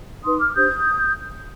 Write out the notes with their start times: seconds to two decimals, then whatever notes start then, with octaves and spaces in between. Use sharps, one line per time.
0.24 D#4 B4 C6 D#6
0.39 D6 F6
0.55 D4 G4 C5 D#6 G6